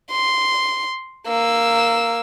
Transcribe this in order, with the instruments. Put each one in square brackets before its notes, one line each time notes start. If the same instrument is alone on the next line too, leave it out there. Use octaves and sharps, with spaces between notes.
[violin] C6
A#3 E6